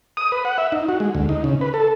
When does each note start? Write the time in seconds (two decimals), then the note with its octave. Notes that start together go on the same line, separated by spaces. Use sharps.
0.17 D#6
0.32 B4
0.45 F#5
0.58 E5
0.72 D#4
0.89 F#4
1.00 G#3
1.15 D2
1.29 D#4
1.44 C#3
1.61 B4
1.74 A4